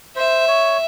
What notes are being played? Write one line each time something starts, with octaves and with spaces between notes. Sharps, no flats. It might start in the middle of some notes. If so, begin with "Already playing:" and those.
C5 E5
C#5